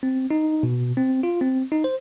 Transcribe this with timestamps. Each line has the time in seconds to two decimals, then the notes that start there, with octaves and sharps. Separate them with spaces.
0.03 C4
0.31 D#4
0.63 B2
0.97 C4
1.23 F4
1.41 C4
1.72 D#4
1.84 C5